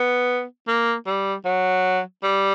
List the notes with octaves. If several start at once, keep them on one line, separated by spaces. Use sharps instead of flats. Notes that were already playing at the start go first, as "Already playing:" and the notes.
Already playing: B3
A#3
G3
F#3
G3